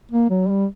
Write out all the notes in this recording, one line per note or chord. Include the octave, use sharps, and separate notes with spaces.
A#3
F#3
G3